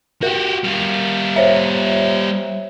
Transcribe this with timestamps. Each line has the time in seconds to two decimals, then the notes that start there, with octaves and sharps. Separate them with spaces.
0.23 F#4 G4 A#4
0.64 G3 F4
1.36 C5 C#5 E5